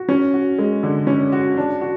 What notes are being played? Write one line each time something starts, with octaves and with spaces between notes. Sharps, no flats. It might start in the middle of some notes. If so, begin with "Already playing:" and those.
Already playing: F#4
C#4
F#4
G#3
D3
C#4
F#4
D4
F#4